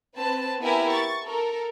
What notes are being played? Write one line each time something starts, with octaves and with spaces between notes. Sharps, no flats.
C4 B4 A5
B3 E4 G4 A#4 B4 G#5
C#6 A6
A4 A#4